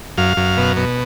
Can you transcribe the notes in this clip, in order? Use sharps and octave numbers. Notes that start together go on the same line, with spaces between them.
F#2 F5
F#2
B2
B2